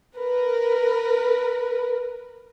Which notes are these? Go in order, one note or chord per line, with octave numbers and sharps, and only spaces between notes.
A#4 B4